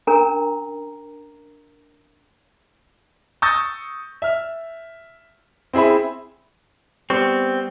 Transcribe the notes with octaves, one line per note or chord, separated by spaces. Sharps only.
C#4 D4 A#4 A#5
C#6 D#6 E6 G6 A6 A#6
E5 F6
C4 E4 G#4 E5 B5
G3 B3 C4 C#6